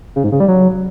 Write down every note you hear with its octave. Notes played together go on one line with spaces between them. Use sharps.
C#3
G#2
C#3
G3
F#3